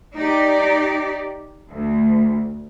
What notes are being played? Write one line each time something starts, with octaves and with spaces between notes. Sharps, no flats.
D#4 G4 D5
D2